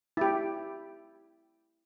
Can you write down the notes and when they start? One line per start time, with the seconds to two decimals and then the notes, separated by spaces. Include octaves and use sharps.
0.17 E4 G4